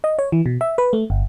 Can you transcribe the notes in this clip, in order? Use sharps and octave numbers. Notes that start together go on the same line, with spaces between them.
D#5
C#5
E3
B2
E5
B4
A3
G1